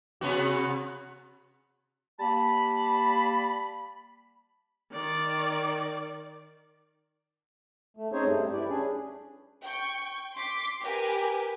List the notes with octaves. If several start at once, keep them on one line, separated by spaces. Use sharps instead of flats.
C3 B3 F#4
G3 A#3 A5 B5
D#3 D5
A3
C4 C#4 D#4 G#4 C5 C#5
G2 G3 A3
E4 G4 B4 D5
C#4 D4 G#4
G5 C#6
C6 D6 B6
G4 A#4 B4 G#5